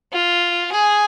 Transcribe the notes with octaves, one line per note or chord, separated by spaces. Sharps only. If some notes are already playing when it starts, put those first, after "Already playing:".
F4
G#4